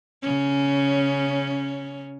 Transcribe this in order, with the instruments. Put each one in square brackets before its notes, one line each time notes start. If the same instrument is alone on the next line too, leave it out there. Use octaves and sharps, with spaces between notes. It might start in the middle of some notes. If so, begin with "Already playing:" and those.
[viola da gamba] C#3 C#4